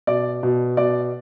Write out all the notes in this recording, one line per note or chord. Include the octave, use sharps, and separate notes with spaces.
B2 D5
B2
B2 D5